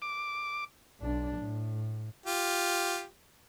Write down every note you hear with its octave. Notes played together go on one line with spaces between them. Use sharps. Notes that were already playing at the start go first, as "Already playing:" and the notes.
D6
B1 D4
A2
F4 G4